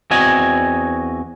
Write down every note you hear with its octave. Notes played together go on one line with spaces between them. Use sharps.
E2 C4 F#4 D#5 G#5